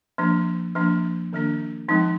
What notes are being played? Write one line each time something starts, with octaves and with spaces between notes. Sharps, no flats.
F3 A#3 D4
F3 A#3 D4
D#3 A#3 D4
F3 G#3 C4 D#4